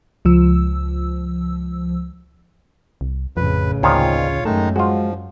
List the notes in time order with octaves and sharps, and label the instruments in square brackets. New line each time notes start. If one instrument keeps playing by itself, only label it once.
[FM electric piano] C#2 F3 E6
[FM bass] C2
[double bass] A1 C#3 [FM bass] F2 [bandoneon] B4
[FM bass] D2 [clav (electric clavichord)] A#2 D#3 F3 [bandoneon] F4 C#5 F5
[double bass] F#2 [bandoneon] D#3 G#3 D#4 [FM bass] A3 [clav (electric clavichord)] A5
[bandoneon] F3 [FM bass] G#3 [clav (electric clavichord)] F4 F#4